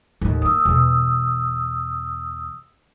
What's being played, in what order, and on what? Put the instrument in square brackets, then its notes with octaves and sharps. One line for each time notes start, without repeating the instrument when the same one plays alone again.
[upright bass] D#2 A2
[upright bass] A#3 [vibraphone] D#6 E6
[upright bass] E2 B2